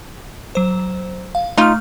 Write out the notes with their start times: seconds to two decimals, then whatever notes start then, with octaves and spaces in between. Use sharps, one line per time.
0.55 F#3 C5
1.35 F5
1.57 A3 D#4 F4 F6